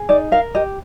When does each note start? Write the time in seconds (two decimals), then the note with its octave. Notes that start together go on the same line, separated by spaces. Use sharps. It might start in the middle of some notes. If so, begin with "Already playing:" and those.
Already playing: G#4
0.09 D#4 D5
0.32 A#4 F5
0.55 G4 D#5